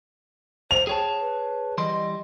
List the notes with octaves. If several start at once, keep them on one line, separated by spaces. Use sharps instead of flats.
C5 F7
G#4 C#5 G5 A5
B4
E3 G3 D#5 C6